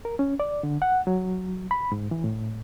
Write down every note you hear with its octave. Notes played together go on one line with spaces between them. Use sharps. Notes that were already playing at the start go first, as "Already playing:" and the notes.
A#4
C#4
D5
D3
F#5
F#3
B5
G#2
E3
A2